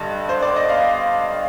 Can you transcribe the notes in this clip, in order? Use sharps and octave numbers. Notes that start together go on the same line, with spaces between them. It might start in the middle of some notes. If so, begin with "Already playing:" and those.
Already playing: G2 D3 G3 D#5
C5
D5
D#5
F5